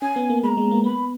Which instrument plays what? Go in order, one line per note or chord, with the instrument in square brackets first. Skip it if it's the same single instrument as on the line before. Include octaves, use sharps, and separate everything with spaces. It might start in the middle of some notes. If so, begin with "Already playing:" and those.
[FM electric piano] C#4 [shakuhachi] G#5
[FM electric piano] B3
A#3
[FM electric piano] G#3 [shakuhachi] A#5 B5
[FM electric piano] G#3
A#3
[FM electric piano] B3 [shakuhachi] B5